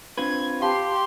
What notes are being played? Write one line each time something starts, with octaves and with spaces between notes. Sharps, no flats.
C4 D4 F4 B4 G#6
G4 F5 A5 C6